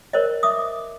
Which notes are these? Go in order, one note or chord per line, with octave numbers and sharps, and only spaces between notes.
A#4 C5 C#5 D#5
E5 D6 D#6